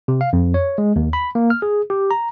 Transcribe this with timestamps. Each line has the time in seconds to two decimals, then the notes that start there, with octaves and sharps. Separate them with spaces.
0.08 C3
0.21 F5
0.33 F2
0.54 C#5
0.78 G#3
0.96 D#2
1.13 B5
1.35 A#3
1.50 F6
1.62 G#4
1.90 G4
2.11 A#5